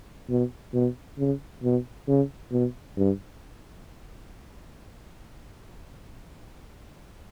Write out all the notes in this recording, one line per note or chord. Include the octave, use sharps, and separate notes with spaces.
B2
B2
C#3
B2
C#3
B2
G2